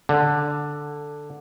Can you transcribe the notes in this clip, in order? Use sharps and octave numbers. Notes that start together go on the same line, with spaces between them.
D3